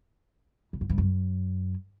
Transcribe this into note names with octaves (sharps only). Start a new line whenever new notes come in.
A2
G#2
G2
F#2